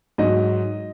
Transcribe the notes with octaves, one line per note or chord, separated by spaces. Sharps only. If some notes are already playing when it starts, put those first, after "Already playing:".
G#2 F#3 D#5